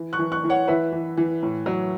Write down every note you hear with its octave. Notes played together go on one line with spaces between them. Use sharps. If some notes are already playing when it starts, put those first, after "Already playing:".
Already playing: E3
C#6 F#6
E3
C#6 F#6
E3
C#5 F#5
E3 B4 E5
E3
E3
A2
F#3